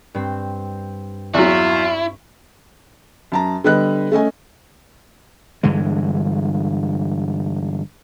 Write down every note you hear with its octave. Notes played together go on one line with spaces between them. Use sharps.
G2 C4
E2 F#3 E4 F4 C#6
F#2 A5 A#5
D3 G3 B3 B4 D#5 F#6
A3 C#4 D#5 G#5
G2 D3 E3 G#3